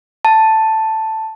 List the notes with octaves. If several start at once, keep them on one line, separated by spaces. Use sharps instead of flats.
A5